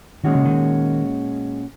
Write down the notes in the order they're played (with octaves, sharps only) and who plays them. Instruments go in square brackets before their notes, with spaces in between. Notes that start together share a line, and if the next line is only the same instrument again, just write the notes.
[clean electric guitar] A#2 G#3 C#4 F#4 [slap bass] D#3
[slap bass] C#3
D#3